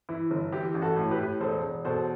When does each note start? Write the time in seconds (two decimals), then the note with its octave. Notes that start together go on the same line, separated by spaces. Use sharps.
0.09 E3 E4
0.31 G1
0.52 E3 E4 G4
0.74 A1
0.81 F#4 A4
0.96 A2
1.11 G4 B4
1.19 A2
1.40 E1 A4 C5
1.63 E1
1.85 B2 A4 C5